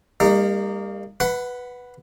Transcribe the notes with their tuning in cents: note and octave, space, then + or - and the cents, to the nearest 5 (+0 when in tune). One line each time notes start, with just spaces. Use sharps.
G3 +35 A#3 -15 D#4 -20
B4 +0 F#5 +0 B5 +40